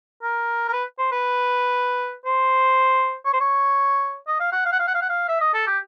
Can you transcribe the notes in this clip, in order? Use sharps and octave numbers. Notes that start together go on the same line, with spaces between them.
A#4
A#4
B4
C5
B4
C5
C#5
C5
C#5
D#5
F5
F#5
F5
F#5
F5
F#5
F5
F#5
F5
E5
D#5
A4
G4